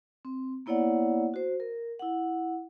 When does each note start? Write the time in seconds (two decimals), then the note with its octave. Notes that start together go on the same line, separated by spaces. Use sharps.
0.25 C4
0.66 A#3 B3 E4 C#5 D5 F#5
1.34 F#4 C5
1.60 A#4
1.99 E4 F#5